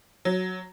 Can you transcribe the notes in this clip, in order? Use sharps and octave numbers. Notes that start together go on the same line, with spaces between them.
F#3